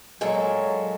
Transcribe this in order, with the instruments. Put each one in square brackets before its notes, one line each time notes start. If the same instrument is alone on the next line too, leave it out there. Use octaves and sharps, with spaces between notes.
[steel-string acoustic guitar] A#2 G#3 A4 [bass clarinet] F#3